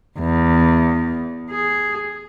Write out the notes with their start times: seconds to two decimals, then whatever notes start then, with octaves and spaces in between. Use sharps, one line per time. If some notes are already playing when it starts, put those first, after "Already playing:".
0.19 E2
1.50 G#4